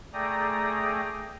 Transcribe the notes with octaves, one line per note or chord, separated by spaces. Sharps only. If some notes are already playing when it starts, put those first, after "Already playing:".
A3 G#4 D5 G5 A#5 D#6